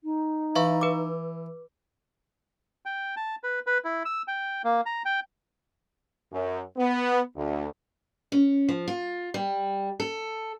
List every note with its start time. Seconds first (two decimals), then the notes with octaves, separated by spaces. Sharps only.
0.03 D#4
0.56 E3 E5 F5 C#6
0.81 B4 D6
2.86 G5
3.16 A5
3.43 B4
3.67 B4
3.84 E4
4.05 E6
4.28 G5
4.64 A#3
4.86 A#5
5.05 G5
6.32 F#2
6.77 B3
7.35 D2
8.32 C#4
8.69 F3
8.88 F4
9.34 G3
10.00 A4